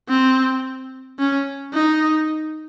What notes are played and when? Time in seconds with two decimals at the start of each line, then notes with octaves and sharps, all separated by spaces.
0.09 C4
1.19 C#4
1.73 D#4